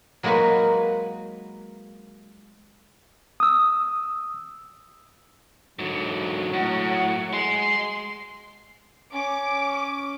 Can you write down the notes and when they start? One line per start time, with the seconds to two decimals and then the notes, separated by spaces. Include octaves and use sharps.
0.23 F#3 G#3 A#3 D#4 F#4 B4
3.40 D#6 E6
5.79 G#2 D3 F#3
6.54 A2 F#5
7.33 G#3 C6
9.14 C#4 D6